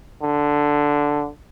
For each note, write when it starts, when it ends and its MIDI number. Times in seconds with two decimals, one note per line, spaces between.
0.22 1.29 50